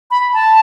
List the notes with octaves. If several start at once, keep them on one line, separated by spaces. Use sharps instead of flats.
B5
A5